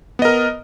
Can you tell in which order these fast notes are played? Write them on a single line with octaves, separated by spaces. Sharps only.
B3 D#5 A#4